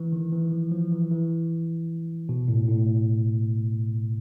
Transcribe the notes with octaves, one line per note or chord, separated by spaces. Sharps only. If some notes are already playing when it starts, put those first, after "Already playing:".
Already playing: E3
D#3
E3
F3
F3
E3
E3
B2
A2
A2